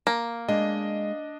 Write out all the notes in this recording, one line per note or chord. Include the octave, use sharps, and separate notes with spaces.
A#3
G#3 D4 D#5